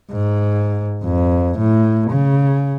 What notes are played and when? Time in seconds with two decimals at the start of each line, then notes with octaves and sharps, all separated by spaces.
0.12 G#2
1.03 F2
1.58 A2
2.11 C#3